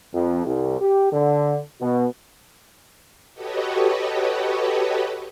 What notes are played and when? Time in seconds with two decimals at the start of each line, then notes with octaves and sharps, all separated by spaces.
0.13 F2
0.45 C2
0.80 G4
1.11 D3
1.81 B2
3.34 F#4 G4 A4 B4 C#5 D#5